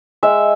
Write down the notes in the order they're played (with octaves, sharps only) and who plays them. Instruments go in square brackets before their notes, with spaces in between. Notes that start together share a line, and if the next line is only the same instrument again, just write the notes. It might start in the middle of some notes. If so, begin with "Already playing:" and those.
[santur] G#3 E5